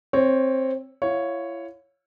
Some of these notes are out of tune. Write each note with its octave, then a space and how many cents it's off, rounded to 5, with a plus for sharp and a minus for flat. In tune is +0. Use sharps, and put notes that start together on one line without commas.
C4 +10 C#5 +0
E4 +40 C#5 +0 F5 +25